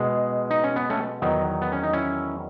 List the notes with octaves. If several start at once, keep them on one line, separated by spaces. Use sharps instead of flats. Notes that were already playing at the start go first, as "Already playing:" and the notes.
Already playing: B2 G#3
D#4
C#4
B3
A3 C#4
E2 D#3 F#3 B3 D#4
B3
C#4
D#4
C#4 E4